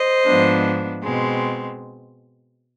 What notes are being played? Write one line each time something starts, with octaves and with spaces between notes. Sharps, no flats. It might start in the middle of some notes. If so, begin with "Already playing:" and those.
Already playing: C5 D#5
G#2 F3 B3 D4
B2 G#3 C4